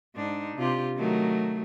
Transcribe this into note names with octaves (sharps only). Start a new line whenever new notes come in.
G#2 D4 D#4
C3 F4 G4
D#3 F#3 A3